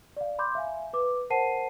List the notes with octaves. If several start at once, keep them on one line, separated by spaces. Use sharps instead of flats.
D5 F5
B5 C6 D6 G6
E5 F5 G#5
B4 D6
A#4 C5 F#5 A5 C7 D#7